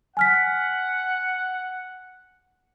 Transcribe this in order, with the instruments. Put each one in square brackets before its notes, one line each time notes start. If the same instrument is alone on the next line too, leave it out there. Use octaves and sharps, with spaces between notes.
[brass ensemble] F#5 [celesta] G#5 F6 B6